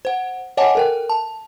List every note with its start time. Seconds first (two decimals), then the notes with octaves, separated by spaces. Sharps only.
0.05 C5 F#5
0.57 C#5 D#5 F#5 G#5 A5 D6
0.75 A4 A#4 G5
1.10 A5